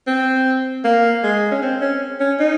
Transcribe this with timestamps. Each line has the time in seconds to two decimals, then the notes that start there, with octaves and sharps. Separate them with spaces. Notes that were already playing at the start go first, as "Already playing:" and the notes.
0.07 C4
0.84 A#3
1.23 G#3
1.52 C#4
1.63 C4
1.82 C#4
2.20 C#4
2.40 D#4